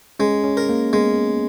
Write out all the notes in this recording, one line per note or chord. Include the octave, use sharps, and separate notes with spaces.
G#3 C#4
C#4
A#4
A#3
G#3 B3